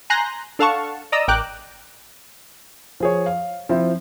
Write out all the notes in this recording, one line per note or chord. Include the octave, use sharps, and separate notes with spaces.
G#5 A#5 C6 F#6 G6 A#6
D4 A4 F5 F#5 A5 C#6
D5 D#5 A#5 D#6 E6
A1 A#4 G5 D6 F#6
F3 G#4 C#5
F5
F3 C4 E4